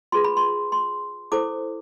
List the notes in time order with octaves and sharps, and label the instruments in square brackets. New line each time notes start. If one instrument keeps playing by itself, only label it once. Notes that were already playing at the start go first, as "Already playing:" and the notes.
[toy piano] F4 G#4 B4 C6
B5
C6
C6
E4 A4 C5 D6